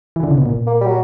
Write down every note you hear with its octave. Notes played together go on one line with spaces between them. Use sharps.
E3
D3
C#3
B2
A#2
A#3
G3
F#3